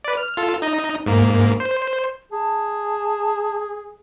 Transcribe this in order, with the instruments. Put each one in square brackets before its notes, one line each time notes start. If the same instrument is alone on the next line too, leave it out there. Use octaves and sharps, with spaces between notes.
[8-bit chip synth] B4 D5
F6
F4 A4
D#4 D#5
G#2 A#3
C5
[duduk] G#4 [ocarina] A5